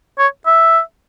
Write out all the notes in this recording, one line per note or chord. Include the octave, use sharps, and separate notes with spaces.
C#5
E5